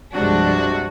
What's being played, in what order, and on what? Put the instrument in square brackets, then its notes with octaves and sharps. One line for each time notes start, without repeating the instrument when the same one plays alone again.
[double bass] C2 G2 [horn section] C3 F#4 [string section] F3 G#3 D4